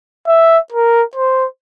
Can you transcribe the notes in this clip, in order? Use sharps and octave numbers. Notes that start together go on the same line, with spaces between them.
E5
A#4
C5